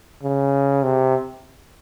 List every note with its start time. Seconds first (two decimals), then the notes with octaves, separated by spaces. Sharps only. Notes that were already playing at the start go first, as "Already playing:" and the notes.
0.23 C#3
0.83 C3